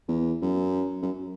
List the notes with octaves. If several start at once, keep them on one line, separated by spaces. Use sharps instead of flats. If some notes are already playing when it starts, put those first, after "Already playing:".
E2
F#2
F#2